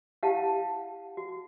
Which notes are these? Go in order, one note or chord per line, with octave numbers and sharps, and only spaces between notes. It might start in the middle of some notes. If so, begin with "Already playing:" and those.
E4 G4 F5 F#5 A5
F#4